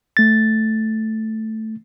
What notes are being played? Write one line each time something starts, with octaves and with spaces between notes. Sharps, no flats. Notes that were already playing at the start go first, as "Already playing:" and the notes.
A3 A6